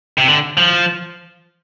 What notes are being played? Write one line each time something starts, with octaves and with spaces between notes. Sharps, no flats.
C3
D3
F3